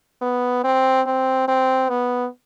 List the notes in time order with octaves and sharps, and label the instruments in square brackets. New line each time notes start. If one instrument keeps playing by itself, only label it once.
[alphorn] B3
C4
C4
C4
B3